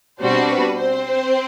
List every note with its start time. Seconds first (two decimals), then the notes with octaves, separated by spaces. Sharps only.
0.20 B2 G3 C4 D4 F#4 C5
0.49 B4
0.78 C4 C5